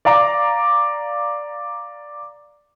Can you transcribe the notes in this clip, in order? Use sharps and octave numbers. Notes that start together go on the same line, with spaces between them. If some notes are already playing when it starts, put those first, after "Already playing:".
D5 F5 A#5 D6